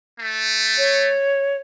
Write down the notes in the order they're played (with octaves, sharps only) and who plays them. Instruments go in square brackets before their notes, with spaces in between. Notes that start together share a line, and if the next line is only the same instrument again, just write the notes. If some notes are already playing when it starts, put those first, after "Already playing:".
[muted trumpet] A3
[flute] C#5